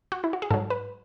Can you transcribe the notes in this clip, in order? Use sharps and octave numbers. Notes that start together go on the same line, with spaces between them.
F#4
E4
F#4
G#4
G#2 F#3 A4
B4